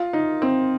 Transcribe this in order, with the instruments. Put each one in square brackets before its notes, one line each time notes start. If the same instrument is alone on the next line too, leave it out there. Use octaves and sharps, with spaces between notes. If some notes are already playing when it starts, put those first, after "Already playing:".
Already playing: [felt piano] F4
D#4
C4